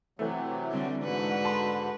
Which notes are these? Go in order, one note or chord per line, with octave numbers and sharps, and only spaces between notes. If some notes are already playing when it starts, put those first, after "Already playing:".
C3 E3 F#3 A3
D3 G3 C4
G#2 D3 G#3 F#4 B4
A5 B5 C6